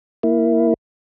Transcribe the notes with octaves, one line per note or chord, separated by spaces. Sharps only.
A#3 E4